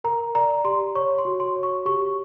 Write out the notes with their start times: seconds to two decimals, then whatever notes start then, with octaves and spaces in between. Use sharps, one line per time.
0.04 A#4 A#5
0.35 D5 A#5
0.64 G4 C6
0.95 C#5 C#6
1.18 C6
1.25 F#4
1.40 C6
1.56 C#5
1.63 C#6
1.86 G4 C#6